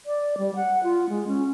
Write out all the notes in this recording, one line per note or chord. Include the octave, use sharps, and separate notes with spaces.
D5
G3
F#5
F4
G#3
C#4